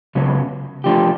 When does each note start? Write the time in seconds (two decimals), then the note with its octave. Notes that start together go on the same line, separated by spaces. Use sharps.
0.15 C#2 C#3 F#3 B3
0.84 F3 A3 D4 G4